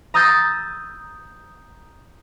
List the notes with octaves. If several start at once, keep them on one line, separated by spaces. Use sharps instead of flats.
A#5 D#6 E6 G6 A6